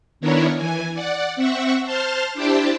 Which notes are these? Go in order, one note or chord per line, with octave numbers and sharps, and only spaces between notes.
D#3 B3 D4 E4 A#4 C#5
E3 G#5
D5 F#5
C4 E5 F#5 C#6
C5 A5 C6 F6
D4 E4 G4 C5 G5 A5